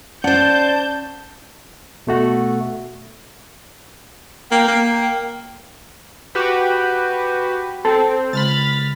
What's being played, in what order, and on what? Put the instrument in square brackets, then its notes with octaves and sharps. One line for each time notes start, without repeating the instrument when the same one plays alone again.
[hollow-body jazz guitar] C#4 F#5 [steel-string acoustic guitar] C5 D5 [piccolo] A5 [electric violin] G6
[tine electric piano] B2 A3 F#4
[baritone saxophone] A#3 [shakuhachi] G5
[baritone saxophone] A#3
[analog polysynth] F#4 G4 B4
[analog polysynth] C4 [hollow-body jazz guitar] A4
[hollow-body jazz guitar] C#2 [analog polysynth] B5 F6 A6